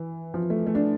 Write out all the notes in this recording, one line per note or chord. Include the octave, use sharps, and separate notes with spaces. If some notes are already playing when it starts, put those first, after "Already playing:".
Already playing: E3
F3
A3
A3
D4